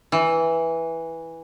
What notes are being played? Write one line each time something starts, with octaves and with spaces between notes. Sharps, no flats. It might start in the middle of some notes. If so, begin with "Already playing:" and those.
E3